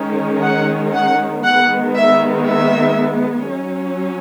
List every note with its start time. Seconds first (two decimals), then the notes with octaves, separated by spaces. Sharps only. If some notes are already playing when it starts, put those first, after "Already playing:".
Already playing: D#3 G#3 C#4
0.41 F#5
0.93 F#5
1.44 D#3 G#3 B3 F#5
1.96 E5
2.47 E5
3.52 F#3 C#4